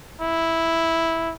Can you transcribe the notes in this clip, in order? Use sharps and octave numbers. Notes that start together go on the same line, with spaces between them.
E4